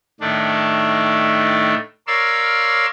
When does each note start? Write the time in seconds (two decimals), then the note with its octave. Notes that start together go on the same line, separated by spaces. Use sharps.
0.20 A2 D#3 A3 D4
2.07 A#4 C#5 D5 F5 C6 E6